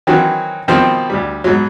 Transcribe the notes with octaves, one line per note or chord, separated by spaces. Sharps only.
D#3 E3 F#3 C4 F#4
B2 D#3 F3 G3 C4
D2 G3
G#2 B2 F#3